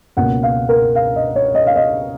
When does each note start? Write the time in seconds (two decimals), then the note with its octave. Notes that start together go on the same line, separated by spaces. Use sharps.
0.17 C#2 B2 A#3 C#4 F#5
0.43 F5
0.69 A#4
0.95 F5
1.16 D#5
1.36 C#5
1.55 D#5
1.67 F5
1.76 D#5